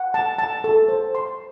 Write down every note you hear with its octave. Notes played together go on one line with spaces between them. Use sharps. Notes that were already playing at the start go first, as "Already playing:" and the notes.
Already playing: F#5
A5
A5
A4
C5
C6